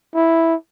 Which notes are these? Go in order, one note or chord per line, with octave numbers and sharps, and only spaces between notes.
E4